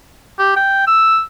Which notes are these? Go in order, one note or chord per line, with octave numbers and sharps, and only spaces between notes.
G4
G5
E6